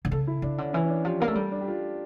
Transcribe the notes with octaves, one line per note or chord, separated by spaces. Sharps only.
D3
C#3 A4
E4
C#3 D4
D3 C#4
E3 C#4
C#4
D4
F3 G4
A#3 A#4
A3
G3 A4
D4
G4
F4